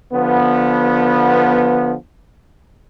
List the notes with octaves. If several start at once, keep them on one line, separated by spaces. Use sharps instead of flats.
D3 F3 B3